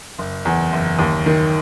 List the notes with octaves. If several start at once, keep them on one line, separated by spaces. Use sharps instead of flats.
F#1
E2
F#1
D#2
D#3